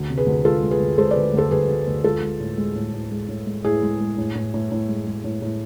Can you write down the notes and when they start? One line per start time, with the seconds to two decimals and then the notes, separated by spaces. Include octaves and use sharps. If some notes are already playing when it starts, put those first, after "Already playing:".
Already playing: D2
0.10 C3
0.18 G#4 B4
0.26 D2
0.44 G#3 F4 A4
0.62 G#3
0.71 G#4 B4
0.80 D2
0.98 G#3 A4 C5
1.11 B4 D5
1.16 D2
1.34 D2 A4 C5
1.51 D2 G#4 B4
1.69 D2
1.87 D2
2.04 G#3 F4 A4
2.22 G#3
2.40 A2
2.57 G#3
2.75 A2
2.93 A2
3.11 G#3
3.29 A2
3.46 G#3
3.64 A2 E4 G#4
3.82 G#3
4.00 G#3
4.18 A2
4.35 A2
4.54 A2
4.72 A2
4.89 G#3
5.07 G#3
5.24 A2
5.42 A2